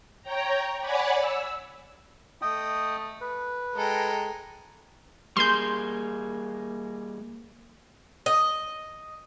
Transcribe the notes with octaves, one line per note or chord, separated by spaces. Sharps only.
C#5 G5 A#5
C#5 D5 F#5 G#5 B5 D6
E6
A3 D#5 G5 D#6
B4
G#3 A4 A#4 G5
G3 A#3 G#4 C6 G6
D#5